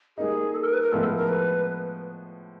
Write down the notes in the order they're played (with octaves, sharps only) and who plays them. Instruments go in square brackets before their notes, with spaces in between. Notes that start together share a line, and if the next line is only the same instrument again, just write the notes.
[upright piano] G3 A#3 D#4 [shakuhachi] G#4
[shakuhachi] A4
A#4
B4
A#4
[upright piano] A2 F3 G#3 B3 [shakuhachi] A4
[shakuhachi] A#4
A#4
B4